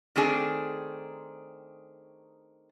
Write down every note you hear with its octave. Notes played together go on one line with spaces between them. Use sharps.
D#3 A3 C4 D4 G#4